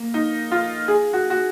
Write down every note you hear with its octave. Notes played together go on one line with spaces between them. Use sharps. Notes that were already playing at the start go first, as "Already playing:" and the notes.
Already playing: A#3
D#4
F4
G#4
F#4
F#4